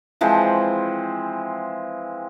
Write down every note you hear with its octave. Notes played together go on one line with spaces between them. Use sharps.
E3 F3 G#3 C4